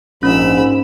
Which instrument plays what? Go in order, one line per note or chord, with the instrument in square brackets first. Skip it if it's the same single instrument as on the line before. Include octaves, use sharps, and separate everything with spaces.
[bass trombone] A#1 [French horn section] G#2 [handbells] C#4 [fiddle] B5 E6